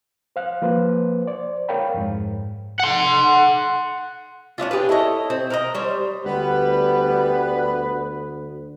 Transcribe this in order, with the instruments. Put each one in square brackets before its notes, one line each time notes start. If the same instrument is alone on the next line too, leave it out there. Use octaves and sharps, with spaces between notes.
[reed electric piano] C5 F5 F#6
F3 A#3 B4 C5
C5 D5
A#4 C#5 F5 G5 B5
F2 G#2
[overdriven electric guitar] F#5 C6
[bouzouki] C#4 D4 E4 F4
D4 G4 G#4 B4
E4 A4 C#5 D#5
C4
A#4 B4 D#5
G3 C5 C#5
[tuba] D2 [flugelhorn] G3 [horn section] B3 B4